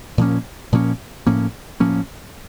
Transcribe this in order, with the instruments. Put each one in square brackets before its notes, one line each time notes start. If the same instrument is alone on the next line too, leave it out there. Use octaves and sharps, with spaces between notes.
[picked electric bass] A#2 F3 A#3 C#4
A#2 F3 A#3 C#4
A2 F3 A#3 C#4
A2 F3 A#3 C#4